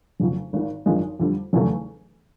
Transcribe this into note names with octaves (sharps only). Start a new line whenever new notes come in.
F1 F2 C#3 F#3
G#1 G#2 D#3
G#1 F#2 D3 F3 G#3
F2 D3 G3
F1 E2 C#3 F#3 A3